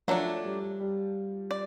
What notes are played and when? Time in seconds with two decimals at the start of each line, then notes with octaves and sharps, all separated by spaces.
0.08 F3 F#3 A3 D4
0.44 G3
0.80 G3
1.51 D5